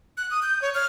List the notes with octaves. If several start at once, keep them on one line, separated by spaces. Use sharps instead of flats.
F#6
D#6
G6
C#5
F6